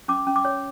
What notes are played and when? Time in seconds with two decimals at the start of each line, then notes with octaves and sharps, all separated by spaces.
0.08 C#4 D6
0.27 C#4
0.36 D6
0.45 C#5